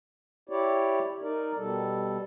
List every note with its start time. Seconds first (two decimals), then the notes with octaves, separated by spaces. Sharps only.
0.49 E4 G4 C#5 D5
1.22 D#4 A#4 D5
1.57 B2 G3 A4